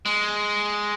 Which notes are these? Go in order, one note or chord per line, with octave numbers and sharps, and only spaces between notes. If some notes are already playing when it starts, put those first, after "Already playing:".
G#3